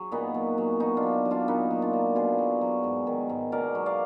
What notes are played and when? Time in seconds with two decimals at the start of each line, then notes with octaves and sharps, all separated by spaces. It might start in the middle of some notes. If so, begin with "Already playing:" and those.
Already playing: F#3 G#4
0.12 A#2 B3 D#4
0.34 F#3
0.58 F#3
0.80 B2 D#4 F#4
0.97 D4 F4
1.03 F#3
1.25 F#3
1.31 D4 F4
1.48 A#2 B3 D#4
1.71 F#3
1.82 D4 F4
1.93 F#3
2.15 B2 F4 G#4
2.38 F#3
2.61 F#3
2.84 G#2
3.07 D#3
3.29 G#2
3.52 B2 A#4 D5
3.75 F#3
3.86 D5 F5